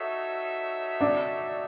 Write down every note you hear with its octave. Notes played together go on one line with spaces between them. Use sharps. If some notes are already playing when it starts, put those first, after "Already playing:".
Already playing: D#4 F#4 A4 C#5 E5
D4